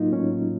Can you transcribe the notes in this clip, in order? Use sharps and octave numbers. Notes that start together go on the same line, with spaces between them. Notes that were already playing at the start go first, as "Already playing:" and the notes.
Already playing: A2 F#3 A#3 D#4 F4
A2 C#4